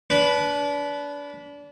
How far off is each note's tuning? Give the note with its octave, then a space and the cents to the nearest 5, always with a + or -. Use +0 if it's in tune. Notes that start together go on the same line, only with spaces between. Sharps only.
D4 -30 B4 +0